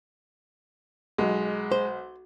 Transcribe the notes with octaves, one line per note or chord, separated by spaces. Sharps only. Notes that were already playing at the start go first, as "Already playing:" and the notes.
B1 G#3
C5